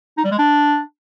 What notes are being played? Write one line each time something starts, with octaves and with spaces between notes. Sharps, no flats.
D#4
G3
G#3
D4